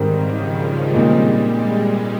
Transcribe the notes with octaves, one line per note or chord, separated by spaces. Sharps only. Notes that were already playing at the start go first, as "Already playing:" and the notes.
Already playing: G#2 D#3 G3 C4 G4 A#4
C#3
F3
G3
A#2 G#3 C4 D#4
G#3
G#3